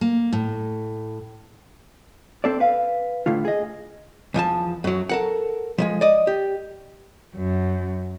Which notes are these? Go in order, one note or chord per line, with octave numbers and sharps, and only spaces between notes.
A#3
A2
C4 A4 D5
B4 F5
A2 D3 A3 F4
G#4 D#5
E2 F3 E5 A5
F#2 F#3
A4 A#4 F#5
F3 F#3 G#3
D5 D#5
G4
F#2